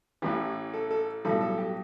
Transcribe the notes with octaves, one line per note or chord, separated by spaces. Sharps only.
A1 A2 E3 G4
A4
A4
B1 A2 G3 A4
A4
G4